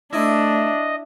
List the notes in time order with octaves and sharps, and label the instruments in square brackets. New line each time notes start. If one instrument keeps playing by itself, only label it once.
[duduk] A3 [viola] D4 [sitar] E4 [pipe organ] D#5